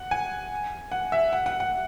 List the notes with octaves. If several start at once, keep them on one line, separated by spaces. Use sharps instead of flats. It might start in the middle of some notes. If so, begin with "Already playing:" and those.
Already playing: F#5
G#5
F#5
E5
F#5
F#5
F#5